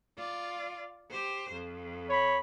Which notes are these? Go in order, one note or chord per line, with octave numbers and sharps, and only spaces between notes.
F4 D5
G4 C5
F2
C#5 B5